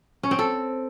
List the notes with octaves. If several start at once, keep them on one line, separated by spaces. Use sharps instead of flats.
C#4
C4
A4